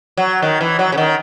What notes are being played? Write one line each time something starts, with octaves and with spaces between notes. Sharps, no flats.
F#3
D#3
E3
F#3
C#3
D#3